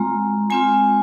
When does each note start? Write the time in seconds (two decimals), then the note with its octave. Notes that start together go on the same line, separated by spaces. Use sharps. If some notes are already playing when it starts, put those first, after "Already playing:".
Already playing: G#3 C4 F4 A#5
0.50 G#3 C4 F4 G#5